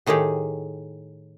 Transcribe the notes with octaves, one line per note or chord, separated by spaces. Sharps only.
A2 D#3 D#4 G4 G#4